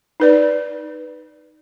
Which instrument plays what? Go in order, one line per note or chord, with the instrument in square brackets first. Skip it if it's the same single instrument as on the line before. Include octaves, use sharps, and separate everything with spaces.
[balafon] D#4 B4 D5